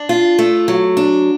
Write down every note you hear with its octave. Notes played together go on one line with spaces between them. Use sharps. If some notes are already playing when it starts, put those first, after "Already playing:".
Already playing: D4
F4
A3
F#3
D4